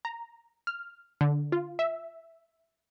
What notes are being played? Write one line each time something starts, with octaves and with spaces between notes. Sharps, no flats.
A#5
F6
D3
F4
E5